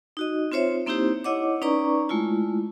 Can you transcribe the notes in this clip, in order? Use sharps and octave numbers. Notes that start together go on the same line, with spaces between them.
D#4 F#4 D#5
C4 F4 C5 C#5 E5
A#3 C4 D#4 E4 G4 C5
E4 C#5 D#5 F#5 D6
C#4 D#4 B4 D5 A#5 C#6
G#3 A3 E4 F4